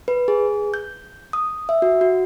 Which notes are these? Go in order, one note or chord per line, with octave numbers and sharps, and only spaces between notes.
B4
G#4
G6
D#6
E5
F#4
F#4